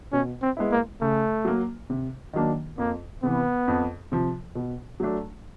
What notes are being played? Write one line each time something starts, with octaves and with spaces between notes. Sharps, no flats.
B2 C#4
C4
G#3 B3 E4
A#3
C#3 A3
F#3 A#3
C3
D#3 F#3 A#3 D4
F2 A#3
C3 E3 B3
F2
C3 F3
B2
F#3 A3 D4